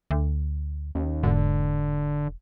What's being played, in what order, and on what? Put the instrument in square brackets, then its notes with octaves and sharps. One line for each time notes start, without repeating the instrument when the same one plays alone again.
[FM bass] D2
[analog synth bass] D#2 [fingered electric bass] C#4
[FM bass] E1 [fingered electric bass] G#2 [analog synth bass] D3